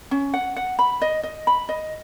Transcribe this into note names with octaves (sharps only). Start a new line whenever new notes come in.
C#4
F#5
F#5
B5
D#5
D#5
B5
D#5